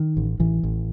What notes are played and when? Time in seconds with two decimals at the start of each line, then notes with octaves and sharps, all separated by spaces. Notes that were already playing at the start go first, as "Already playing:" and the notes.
Already playing: D#3
0.17 A1
0.39 A1 E3
0.63 A1